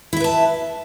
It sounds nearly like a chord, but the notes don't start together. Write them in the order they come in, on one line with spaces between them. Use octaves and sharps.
E4 E5 B4 A5